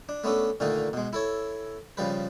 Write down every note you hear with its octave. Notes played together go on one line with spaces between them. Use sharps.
D4
A3 B3 C#4 D4 A4
A#2 D3 D#3 A3 D#4
B2 G#3
E4 A4 C#5
C#3 F3 G3 B4